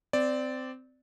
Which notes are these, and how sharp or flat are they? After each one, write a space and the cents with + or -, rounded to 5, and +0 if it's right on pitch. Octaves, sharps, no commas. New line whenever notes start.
C4 -20 D5 +0